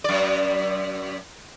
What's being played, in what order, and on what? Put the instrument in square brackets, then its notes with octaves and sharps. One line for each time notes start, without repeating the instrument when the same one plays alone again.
[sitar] F#2 D5